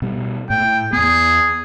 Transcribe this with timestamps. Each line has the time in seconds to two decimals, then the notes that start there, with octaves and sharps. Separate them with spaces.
0.02 B2 G3
0.50 A2 G5
0.93 E2 B3 G#4